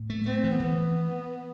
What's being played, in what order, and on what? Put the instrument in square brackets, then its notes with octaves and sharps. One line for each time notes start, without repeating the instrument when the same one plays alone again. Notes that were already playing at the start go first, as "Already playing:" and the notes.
Already playing: [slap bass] A2
A3
[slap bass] A3 [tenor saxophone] C4
[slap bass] E3
[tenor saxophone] B3
[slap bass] E3